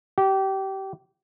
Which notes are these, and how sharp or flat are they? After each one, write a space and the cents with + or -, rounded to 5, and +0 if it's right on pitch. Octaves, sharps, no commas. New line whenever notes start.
G4 -25